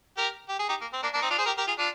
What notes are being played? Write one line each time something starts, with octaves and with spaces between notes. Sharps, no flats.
G4 A#4
G4
G#4
D#4 G4
A#3
C4
A#3 D4
A#3 D4
C4 D#4
D4 F4
G#4 C5
G4 A#4
G4 A#4
F4 G#4
D4 F4